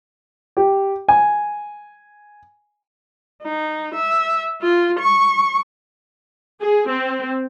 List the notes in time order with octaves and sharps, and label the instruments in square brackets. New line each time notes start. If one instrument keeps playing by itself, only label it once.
[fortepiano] G4
G#5
[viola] D#4
E5
F4
C#6
[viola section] G#4
C4